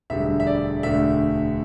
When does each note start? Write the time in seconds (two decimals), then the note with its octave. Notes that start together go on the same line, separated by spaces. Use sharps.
0.10 E1 D2 D3 G3 E5
0.40 E5
0.47 D5
0.83 E1 D2 D3 A3 E5